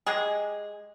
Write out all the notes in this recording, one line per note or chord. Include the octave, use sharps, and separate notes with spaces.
G#3 G4 G#4